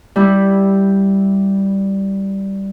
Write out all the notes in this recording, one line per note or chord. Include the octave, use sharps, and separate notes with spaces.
G3 E4